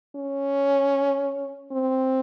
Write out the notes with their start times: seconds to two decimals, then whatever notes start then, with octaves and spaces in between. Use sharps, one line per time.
0.16 C#4
1.72 C4